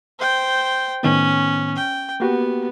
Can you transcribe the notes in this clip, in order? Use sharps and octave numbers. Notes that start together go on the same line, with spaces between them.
C5 G5
A2 D#3 B3 C#4
G5
A#3 B3 F#4 G4